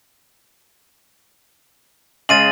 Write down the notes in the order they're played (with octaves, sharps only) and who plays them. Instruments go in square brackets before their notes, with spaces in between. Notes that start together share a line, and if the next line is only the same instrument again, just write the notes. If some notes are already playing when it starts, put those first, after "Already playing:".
[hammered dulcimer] C#3 G#3 [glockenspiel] A6 D#7 F#7